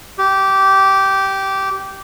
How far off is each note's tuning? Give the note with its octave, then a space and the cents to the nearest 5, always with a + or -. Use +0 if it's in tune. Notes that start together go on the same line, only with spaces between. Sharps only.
G4 -15